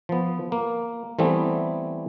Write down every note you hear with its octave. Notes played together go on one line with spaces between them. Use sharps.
F3 B3
A#3
E3 G3 A3 B3 C4